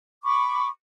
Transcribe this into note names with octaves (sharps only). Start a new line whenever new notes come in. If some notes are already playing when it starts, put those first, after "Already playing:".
B5 C#6 D6